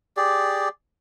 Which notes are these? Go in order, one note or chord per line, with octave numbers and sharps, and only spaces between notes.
G4 G#4 D5